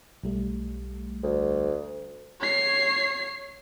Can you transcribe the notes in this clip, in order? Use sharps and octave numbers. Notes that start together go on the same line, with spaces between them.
B1 G3 A3
D2
C#5 C7